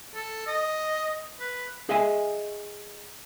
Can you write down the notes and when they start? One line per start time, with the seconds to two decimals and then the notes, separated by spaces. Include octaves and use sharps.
0.15 A4
0.47 D#5
1.40 B4
1.89 G#4 D#5 E5 G#5